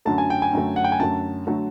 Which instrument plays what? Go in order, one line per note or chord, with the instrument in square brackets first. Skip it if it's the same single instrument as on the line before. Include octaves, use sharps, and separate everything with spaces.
[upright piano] F#2 D3 F#3 A3 [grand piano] A5
[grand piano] G#5
G5
G#5
[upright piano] F#2 D3 F#3 A3
[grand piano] F#5
G5
G#5
[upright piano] F#2 D3 F#3 A3 [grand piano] A5
[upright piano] D3 F#3 A3